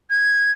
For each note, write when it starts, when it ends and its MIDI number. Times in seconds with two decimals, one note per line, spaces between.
0.10 0.50 92